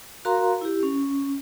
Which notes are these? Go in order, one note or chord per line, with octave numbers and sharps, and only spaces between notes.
F#4 A#4 F5 A#5 C6
E4 G4
C#4